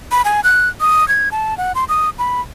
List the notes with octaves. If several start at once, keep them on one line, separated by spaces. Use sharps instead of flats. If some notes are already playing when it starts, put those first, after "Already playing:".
B5
G#5
F#6
D#6
G#6
A5
F#5
C6
D#6
B5